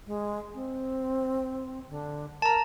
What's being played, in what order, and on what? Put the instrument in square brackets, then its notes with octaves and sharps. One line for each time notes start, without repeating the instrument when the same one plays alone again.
[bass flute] G#3
C4
D3
[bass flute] A#4 [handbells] A5 A#5